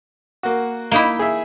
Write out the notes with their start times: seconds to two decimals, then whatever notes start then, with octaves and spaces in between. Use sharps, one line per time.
0.43 A#3 F#4
0.91 A#3 D#4 E4
1.19 G#4 E5